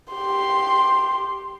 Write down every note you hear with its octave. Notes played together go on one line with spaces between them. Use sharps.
G4 C6